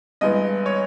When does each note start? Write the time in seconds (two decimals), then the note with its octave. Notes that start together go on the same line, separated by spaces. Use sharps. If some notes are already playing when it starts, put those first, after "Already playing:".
0.21 G2 E3 G#3 B3 D#5
0.66 C#5